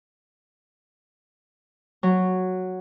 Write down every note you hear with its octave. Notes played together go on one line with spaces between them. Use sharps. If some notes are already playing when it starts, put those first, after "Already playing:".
F#3